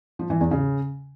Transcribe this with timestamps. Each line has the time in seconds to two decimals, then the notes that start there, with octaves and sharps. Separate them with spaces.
0.19 F3
0.30 E3
0.41 E2
0.51 C#3